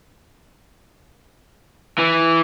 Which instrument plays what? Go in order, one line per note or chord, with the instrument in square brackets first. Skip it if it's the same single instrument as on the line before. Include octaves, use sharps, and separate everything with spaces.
[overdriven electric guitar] E3